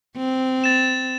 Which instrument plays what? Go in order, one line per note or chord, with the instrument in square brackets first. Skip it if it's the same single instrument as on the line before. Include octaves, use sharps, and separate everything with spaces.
[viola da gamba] C4
[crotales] A6 E7